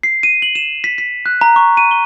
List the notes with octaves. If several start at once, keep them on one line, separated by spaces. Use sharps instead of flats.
C7
D#7
F#7
E7
B6
B6
F#6
A#5
C#6
D#7
G7